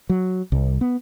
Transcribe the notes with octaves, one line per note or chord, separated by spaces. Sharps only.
F#3
C2
B3